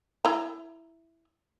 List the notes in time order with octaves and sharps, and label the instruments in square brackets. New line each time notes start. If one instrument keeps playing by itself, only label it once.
[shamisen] E4 A#5